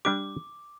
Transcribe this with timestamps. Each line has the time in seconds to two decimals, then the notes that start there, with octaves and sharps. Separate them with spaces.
0.05 G3 D4 G4 D6